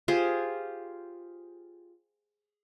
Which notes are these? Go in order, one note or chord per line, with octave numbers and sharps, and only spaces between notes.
F4 G4 G#4 C5